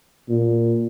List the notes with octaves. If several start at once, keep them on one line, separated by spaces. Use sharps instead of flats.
A#2